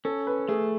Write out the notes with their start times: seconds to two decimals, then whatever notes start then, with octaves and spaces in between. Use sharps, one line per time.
0.05 C#4 A4
0.27 B4
0.48 A3 G#4